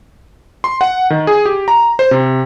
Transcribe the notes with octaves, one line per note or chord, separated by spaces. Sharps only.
C6
F#5
D#3
G#4
G4
A#5
C5
C3